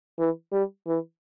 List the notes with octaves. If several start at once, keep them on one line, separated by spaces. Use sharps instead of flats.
E3
G3
E3